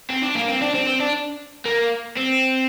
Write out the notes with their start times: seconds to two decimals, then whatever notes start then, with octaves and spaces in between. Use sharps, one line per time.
0.10 C4
0.23 D4
0.36 A#3
0.49 C4
0.62 D4
0.75 C4
0.87 C4
1.00 D4
1.65 A#3
2.17 C4